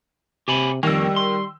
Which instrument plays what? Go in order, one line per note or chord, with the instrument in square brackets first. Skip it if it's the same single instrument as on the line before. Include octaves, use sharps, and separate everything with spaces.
[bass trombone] C3 [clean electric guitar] G4 G#5 B5
[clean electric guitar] F2 A#3 [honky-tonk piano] D#3 E6 [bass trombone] G3
[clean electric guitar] C6